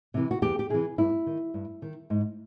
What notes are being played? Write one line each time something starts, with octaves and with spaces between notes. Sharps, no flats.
C3 E3
F#4
E2 G4
G4
C3 E3 G#4
G2 E4
D#3
G2
D#3
G#2